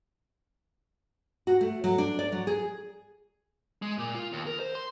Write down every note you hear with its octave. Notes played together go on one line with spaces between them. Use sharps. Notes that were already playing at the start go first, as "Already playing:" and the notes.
F#4
A3
F#3
D4
D5
F#3
G#4
G#3
A#2
F4
D#2
A#4
C5
C6